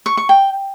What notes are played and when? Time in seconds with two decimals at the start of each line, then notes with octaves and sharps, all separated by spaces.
0.06 C#6
0.17 C#6
0.29 G5